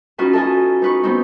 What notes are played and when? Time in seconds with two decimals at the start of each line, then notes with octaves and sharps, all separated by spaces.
0.18 C#4 D#4 F4 F#4 B4
0.33 A4 D#5 G#5
0.82 D#4 B4 C#6
1.03 B3 C4 D#4